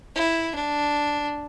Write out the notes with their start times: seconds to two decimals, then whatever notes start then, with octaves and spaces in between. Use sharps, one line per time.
0.16 E4
0.55 D4